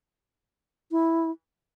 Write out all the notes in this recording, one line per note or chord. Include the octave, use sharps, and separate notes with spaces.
E4